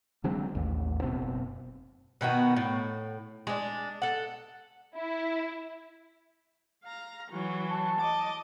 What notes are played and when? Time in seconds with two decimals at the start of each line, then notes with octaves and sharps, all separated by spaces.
0.24 D3 F#3 G#3 C4
0.55 A1 D#2
1.02 F#1 B2 C4
2.21 B2 D#3 B3 F#4
2.56 A2
3.47 G#3 D4
4.02 A4 F#5
4.95 E4
6.84 F5 A#5
7.31 E3 F#3
7.69 A5
8.00 D#5 D6